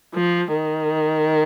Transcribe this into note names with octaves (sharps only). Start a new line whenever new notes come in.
F3
D#3